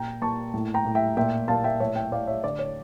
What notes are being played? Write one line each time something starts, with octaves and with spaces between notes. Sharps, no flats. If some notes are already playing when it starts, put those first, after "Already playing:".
Already playing: A#2 G5 A#5
A#2 A5 C#6
A2
G5 A#5
A2
E5 G5
A#2 E5 G5
A#2 F5 A5
E5 G5
A2 C#5 E5
E5 G5
A2 D5 F5
C#5 E5
D3 D5
C#5